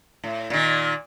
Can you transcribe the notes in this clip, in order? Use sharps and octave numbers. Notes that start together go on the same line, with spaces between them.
A2
A#2 D#3